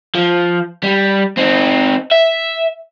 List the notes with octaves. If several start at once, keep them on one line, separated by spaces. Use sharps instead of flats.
F3
G3
C4 D#4
E5